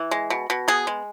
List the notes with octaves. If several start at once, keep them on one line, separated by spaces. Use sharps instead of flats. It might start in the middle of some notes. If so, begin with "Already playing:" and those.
Already playing: E3
G#3
B2
B2
B3 G#4
G#3